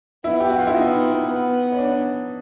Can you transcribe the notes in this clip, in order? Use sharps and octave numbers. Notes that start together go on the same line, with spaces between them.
B3 E4
G4
F#4
F4
E4
B3 D#4
B3
C#4
D4